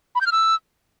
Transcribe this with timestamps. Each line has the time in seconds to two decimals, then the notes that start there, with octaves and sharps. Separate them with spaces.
0.15 B5
0.21 G6
0.26 F6
0.32 E6